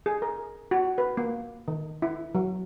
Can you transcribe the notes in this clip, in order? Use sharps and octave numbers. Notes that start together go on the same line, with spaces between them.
G#4
A#4
F#4
B4
A#3
D#3
E4
F#3